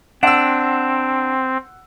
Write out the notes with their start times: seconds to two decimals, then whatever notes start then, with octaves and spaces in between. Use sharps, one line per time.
0.23 C4 D4 F#5 E6